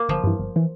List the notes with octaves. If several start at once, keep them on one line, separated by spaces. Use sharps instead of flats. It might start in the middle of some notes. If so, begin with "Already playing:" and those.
Already playing: A#3
G1 F3
G2 E3
G1
E3